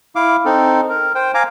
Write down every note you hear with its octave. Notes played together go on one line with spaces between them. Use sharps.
E4 F5 D6
C4 D#4 A4
A#4
C5 G5
F5 G#5 A#5 D6